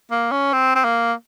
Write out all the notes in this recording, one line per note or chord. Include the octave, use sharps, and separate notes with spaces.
A#3
C#4
C4
C4
A#3